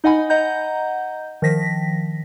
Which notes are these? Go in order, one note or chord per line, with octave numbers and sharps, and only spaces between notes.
D#4 D#5 F#5 G#5 B5
D#5 F#5 A#5 G6
D#3 F3 A#6 B6